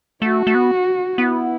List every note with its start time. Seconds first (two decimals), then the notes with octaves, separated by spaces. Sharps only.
0.22 A3 F#4
0.47 A3
0.55 B3
1.17 B3 E4